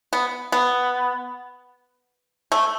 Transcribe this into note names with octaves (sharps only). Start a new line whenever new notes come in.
B3
B3
A3